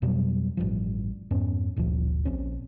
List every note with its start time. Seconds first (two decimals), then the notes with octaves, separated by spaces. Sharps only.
0.02 F2 B2 F#3 G3
0.57 A1 G2 F3
1.31 F2 G#2 B3 C#4
1.76 G1 D2 A#2 F3
2.25 A#1 C4 C#4